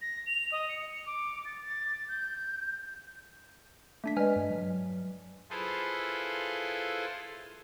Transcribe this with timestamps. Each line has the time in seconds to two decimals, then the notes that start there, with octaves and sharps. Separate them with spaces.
0.02 A#6
0.26 F7
0.52 D#5
0.69 C#7
0.92 C#7
1.06 D6
1.45 A6
1.65 A6
2.08 G6
4.04 A3 D4 B6
4.17 G#3 B4 D5 D#5 G#5 F6
4.36 G2
4.50 F#3
5.50 E4 F4 G#4 A4 B4 C5